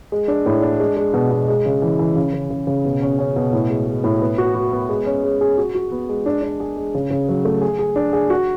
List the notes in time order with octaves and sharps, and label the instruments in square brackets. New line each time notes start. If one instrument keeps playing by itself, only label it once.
[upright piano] G#3
D4
A2
D4
G#3
G#3
B2
B2
G#3
C#3
E3
E3
C#3
C#3
C#3
C#3
B2
C#4
C#4
B2
A2
G#3
G#3
A2
B3
F#4
F#4
B3
G#3
C#4
G#3
G#4
F#4
F#4
B3
G#3
D4
D4
G#4
G#3
C#3
C#3
F#3
A3
G#4
G#4
D4
G#4
F#4